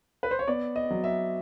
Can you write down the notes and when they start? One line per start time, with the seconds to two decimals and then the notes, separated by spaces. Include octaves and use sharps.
0.23 B4
0.31 C5
0.39 C#5
0.48 B3 D5
0.76 D#5
0.91 F#3
1.04 E5